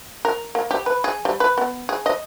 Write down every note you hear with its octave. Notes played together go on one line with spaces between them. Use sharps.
A#4
A#3
G4
B4
G#4
G3
B4
B3
G#4
D#5